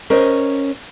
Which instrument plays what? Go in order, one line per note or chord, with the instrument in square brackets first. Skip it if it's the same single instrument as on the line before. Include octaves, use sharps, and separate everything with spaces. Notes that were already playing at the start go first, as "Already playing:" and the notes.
[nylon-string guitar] C#4 A#4 C5 D#5